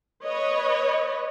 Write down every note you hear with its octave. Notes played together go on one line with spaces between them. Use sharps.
B4 C#5 D#5